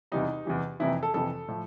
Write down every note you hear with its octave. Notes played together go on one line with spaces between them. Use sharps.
E2 C3 E3 G3 D#4
E2 C3 E3 G3
F2 C3 E3 E4
A4
F2 C3 E3 A4
A2 F3